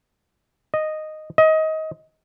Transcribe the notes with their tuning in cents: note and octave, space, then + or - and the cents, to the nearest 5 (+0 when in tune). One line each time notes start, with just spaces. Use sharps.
D#5 -5
D#5 +25